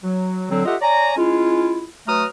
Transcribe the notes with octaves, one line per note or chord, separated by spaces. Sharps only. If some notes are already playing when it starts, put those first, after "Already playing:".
F#3
D3 F#3 C4
A3 F4 G4 D#5 E5 F#5
C#5 D5 G#5 A#5
G#3 C#4 E4 F4
F#3 A3 B4 A#5 D#6 F6